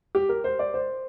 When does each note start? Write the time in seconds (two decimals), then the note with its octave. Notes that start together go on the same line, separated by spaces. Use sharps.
0.15 G4
0.29 A#4
0.44 C5
0.59 D5
0.74 C5